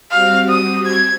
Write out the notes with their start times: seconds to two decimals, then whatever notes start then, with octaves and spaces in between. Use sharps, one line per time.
0.11 G3 C4 F#4 F5
0.49 D#6
0.85 G#6